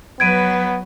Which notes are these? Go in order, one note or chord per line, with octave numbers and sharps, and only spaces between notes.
F#3 B3 B4 G#6 D7 D#7